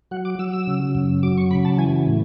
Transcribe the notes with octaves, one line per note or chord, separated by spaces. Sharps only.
F#3 F#5
D6
F#3 E6
E6
C#3
F#2
F#3 D6
C#6
C#3 B5
A5
E3 G#5
A2